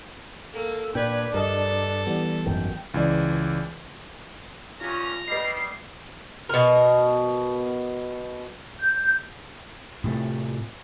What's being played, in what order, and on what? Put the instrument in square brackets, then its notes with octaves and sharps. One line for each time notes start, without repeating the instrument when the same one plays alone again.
[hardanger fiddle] A#3 [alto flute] A4
[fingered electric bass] A#2 [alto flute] D4 [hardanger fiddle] B4 [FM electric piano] G5 G#6
[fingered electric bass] G2 [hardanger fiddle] A4 [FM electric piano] A#4 D#5
[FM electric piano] E3 G3 B3
[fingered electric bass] G#1 F#2 D#3 [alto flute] G5
[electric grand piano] C#2 E3 D5
[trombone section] G2 C#4 [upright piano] F4 [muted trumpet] A#5
[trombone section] D#3 G3 [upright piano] B4 D#5 [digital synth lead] C7
[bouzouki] B2 A#4
[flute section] G6
[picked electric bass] A2 C3 A3